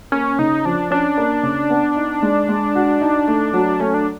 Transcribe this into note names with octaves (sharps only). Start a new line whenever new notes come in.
A#3 C#4
C#3 D#4
F3 D4
C#4 D4
A#3
C#3
B3
D#4
G#3
G#3
F#4
D#4
A3
F#3
A3 C#4
D4